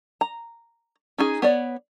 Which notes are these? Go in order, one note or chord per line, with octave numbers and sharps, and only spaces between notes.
A#5
C#4 D#4 G#4
B3 C#5 D5